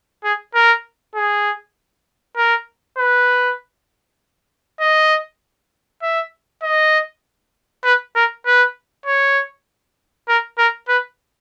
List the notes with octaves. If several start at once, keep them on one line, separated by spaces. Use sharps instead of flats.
G#4
A#4
G#4
A#4
B4
D#5
E5
D#5
B4
A#4
B4
C#5
A#4
A#4
B4